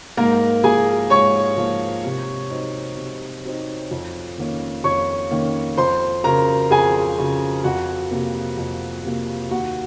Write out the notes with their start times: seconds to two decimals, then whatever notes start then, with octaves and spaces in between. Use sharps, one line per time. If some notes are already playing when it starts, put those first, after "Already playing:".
0.17 G#2 A#3 A#4
0.64 F3 A#3 G#4 G#5
1.10 G#2 C#5 C#6
1.57 F3 A#3
2.05 C3
2.50 F#3 C4 D#4
2.97 C3
3.44 F#3 C4 D#4
3.91 F2
4.38 D#3 A#3 C#4
4.84 F2 C#5 C#6
5.31 D#3 A#3 C#4
5.77 F2 C5 C6
6.24 C#3 F#3 A#4 A#5
6.71 F2 G#4 G#5
7.18 C#3 F#3
7.64 F2 F#4 F#5
8.11 C3 F#3 A#3
8.58 F2
9.04 C3 F#3 A#3
9.51 D#2 F#4 F#5